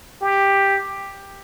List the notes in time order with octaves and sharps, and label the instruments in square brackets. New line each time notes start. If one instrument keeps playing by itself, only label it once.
[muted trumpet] G4